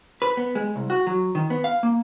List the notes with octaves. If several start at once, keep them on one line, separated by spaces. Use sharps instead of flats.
B4
B3
G#3
C2
F#4
F#3
D#3
B3
F5
A#3